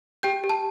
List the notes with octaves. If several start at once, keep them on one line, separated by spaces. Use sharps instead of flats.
G4 G5 G6
G4
A5